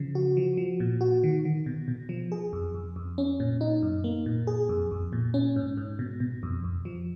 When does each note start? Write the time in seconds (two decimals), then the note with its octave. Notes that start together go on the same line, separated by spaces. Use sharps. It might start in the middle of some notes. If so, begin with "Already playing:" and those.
Already playing: C#3 F3
0.15 F#4
0.37 F3
0.57 F3
0.80 A#2
1.01 F#4
1.23 D#3
1.45 D#3
1.66 B2
1.88 B2
2.09 F3
2.32 G#4
2.53 F2
2.74 F2
2.96 F2
3.18 C#4
3.40 A#2
3.61 D#4
3.82 F#2
4.04 A#3
4.26 A#2
4.47 G#4
4.69 F2
4.91 F2
5.13 A#2
5.34 C#4
5.56 G#2
5.77 G#2
5.99 B2
6.20 B2
6.43 F2
6.64 F2
6.85 F3